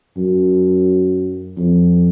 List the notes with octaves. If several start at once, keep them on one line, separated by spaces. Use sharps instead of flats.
F#2
F2